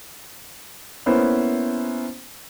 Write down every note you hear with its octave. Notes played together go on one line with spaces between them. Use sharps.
A#3 B3 C#4 E4 C5